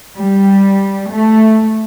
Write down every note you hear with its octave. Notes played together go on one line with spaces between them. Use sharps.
G3
A3